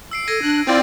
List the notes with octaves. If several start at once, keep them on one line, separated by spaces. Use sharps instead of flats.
E6 C7 D7
A4 G#6 A#6 D#7
D4 F#6
C4 E4 F4 D5 G5